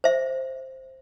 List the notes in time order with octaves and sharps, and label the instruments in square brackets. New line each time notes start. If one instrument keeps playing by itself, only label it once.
[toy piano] C5 E5